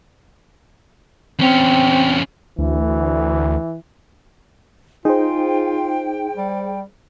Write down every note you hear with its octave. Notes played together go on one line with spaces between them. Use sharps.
E2 C4 C#4
D2 E3
D#4 F4 G#4 C5 G5
G3